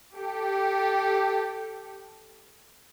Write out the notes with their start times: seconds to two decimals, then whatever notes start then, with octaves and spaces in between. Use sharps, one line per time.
0.15 G4 A4